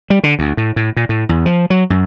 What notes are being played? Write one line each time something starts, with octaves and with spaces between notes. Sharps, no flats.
G3
D3
D2
A2
A2
A#2
A2
E2
F3
F#3
F#2